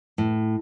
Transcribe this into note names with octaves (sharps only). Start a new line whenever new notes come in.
A2